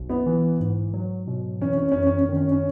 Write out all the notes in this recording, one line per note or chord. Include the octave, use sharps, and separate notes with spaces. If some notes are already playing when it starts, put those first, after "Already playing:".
Already playing: B1 B2
B3
E3
G#2
F#3
B2
E3 C#4
C#4
C#4
F#2
C#4
C#4
D#3
C#4
C#4